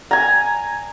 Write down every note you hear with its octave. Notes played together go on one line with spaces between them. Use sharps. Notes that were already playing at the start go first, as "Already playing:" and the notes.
G#5 A#5